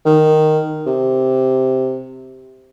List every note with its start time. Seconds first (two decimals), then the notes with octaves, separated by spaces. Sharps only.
0.06 D#3
0.87 C3